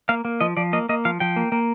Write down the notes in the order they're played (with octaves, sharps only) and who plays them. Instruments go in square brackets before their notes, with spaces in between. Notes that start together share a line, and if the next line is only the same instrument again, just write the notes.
[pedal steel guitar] A#3 F5
A#3
F3 D#5
F3 D5
A#3 D#5
A#3 D#5
F3 F5
F3 G5
A#3
A#3